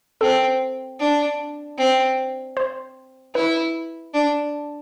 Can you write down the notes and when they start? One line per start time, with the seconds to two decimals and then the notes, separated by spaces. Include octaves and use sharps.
0.21 C4 A4
0.99 D4
1.78 C4
2.57 C5
3.35 E4 B4
4.14 D4